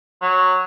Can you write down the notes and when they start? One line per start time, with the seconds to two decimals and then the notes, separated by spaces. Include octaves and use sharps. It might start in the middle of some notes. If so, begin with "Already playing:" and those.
0.22 F#3